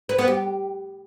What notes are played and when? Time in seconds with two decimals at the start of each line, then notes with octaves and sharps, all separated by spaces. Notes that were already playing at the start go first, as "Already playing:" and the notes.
0.09 B4
0.18 B3
0.28 G4